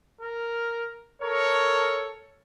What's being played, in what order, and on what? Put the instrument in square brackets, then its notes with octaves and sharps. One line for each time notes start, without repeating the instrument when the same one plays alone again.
[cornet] A#4
[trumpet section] A4 C#5 [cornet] A#4